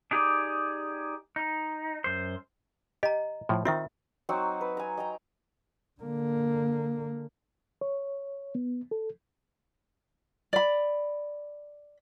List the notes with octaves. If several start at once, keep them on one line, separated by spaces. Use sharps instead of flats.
D4 D#4 G4 G#4 D5
D#4
F#2 C5
G4 D#5 A#5
A2 F3
D#3 C4 F4 E5
F#3 C4 D#4 F#4
B4
G#5 A#5
D#5 G5 A#5
D3 A#3
C#5
B3
A4
D5 B5